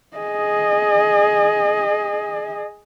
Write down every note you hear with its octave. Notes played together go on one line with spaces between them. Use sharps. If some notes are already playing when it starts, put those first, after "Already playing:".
G#4 D#5